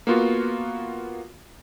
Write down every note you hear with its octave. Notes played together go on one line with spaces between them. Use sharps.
A#3 B3 F4 F#4